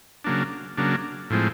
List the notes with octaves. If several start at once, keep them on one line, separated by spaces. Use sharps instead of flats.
C#3 F#3 A#3 D4
C#3 F#3 A#3 D4
A2 F3 G#3 C4